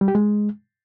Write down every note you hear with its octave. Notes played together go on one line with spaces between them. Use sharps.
G3
G4
G#3